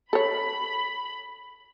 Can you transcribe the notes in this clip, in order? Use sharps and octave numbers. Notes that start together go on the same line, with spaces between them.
A4 C#5 B5